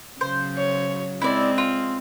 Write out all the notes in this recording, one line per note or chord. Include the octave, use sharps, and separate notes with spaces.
C#3 F#3 C5
C#5
G#3 C4 E4 D5
F4